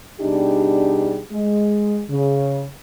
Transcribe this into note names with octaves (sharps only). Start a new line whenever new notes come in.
B2 G3 D4 D#4 G4 G#4
G#3
C#3